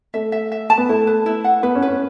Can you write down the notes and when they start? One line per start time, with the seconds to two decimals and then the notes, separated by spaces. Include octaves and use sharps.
0.14 A3 E5
0.32 E5
0.52 E5
0.70 A5
0.78 B3
0.89 A3 E4
1.07 B4
1.26 E4
1.44 F#5
1.63 B3 B4
1.75 C#4
1.82 B4
1.88 C#4